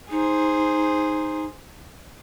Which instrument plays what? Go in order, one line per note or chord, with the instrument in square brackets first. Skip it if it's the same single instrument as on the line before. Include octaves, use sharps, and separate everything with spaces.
[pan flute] D#4 [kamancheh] G#4 C5